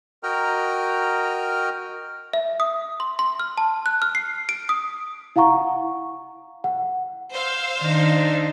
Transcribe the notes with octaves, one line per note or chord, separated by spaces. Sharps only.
F#4 A#4 D#5 G5 A#5 F6
E5
D#6
C6
C6
F6
A5
F#6
F6
C7
D7
D#6
E4 F5 F#5 A#5 C#6
F#5
C5 F5 E6
D#3 D4 D#4